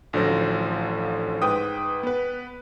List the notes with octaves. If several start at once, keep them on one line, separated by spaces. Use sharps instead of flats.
A1 D3 F3 F#3 C5 A#6
G#2 B4 G5 D#6
B3 B4